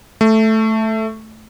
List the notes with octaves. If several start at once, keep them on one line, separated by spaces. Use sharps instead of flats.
A3